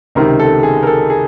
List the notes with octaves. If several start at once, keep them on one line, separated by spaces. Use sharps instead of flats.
C#2 C3 D#3 A#4
A4
G#4
A#4
A4
G#4